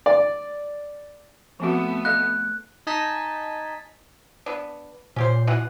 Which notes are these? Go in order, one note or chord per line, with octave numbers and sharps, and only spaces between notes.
D5
F3 A3 B3 C4 F#4
A4 D#5 F5 F#6
D#4 D#5 G#5 A5 B6
B3 D4
A#2 C#4 G4 C5
B2 E3 F#5